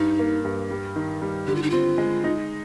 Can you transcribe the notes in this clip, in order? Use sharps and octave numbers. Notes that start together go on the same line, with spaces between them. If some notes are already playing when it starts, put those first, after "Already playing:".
Already playing: G2 D#4
A#3
G2
G3
D#3
G3
D3 G4
F4
D#4
C4 F4
G#3
D#4